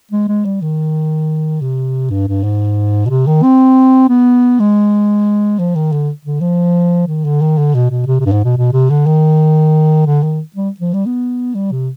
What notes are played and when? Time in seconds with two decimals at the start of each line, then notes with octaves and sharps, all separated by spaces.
0.11 G#3
0.28 G#3
0.45 G3
0.62 D#3
1.61 C3
2.10 G2
2.28 G2
2.43 G#2
3.05 B2
3.09 C3
3.27 D#3
3.43 C4
4.09 B3
4.60 G#3
5.59 F3
5.75 D#3
5.92 D3
6.25 D3
6.41 F3
7.07 D#3
7.24 D3
7.41 D#3
7.58 D3
7.74 B2
7.90 B2
8.07 C3
8.20 C3
8.26 G2
8.32 G#2
8.44 B2
8.57 B2
8.73 C3
8.90 D3
9.06 D#3
10.06 D3
10.23 D#3
10.56 G3
10.80 F3
10.93 G3
11.06 B3
11.55 G3
11.72 C3